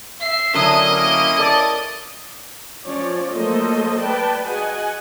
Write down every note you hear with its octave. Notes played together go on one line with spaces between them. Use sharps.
E5 C7
D3 F#3 C#4 E4 A#4 D#5 D#6
A#3
A4 A#4 D5
F3 C#4 C#5 D5
F#3 A3 A#3 A4 C5 D#5
B4 D5 G5 A5
F#4 G#4 D#5 F#5 G#5